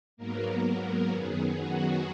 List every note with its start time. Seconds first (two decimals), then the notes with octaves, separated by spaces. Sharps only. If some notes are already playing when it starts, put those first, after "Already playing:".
0.17 G#2 F#3 A#3 B3 A#4
1.11 F#2 D#3 F#3 B3 G#4
1.58 F#4